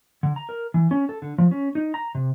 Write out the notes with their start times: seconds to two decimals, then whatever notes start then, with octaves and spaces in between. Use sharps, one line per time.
0.23 D3
0.36 A#5
0.49 A#4
0.74 E3
0.91 C#4
1.09 A4
1.22 D3
1.38 F3
1.51 C#4
1.75 D#4
1.94 A#5
2.15 C3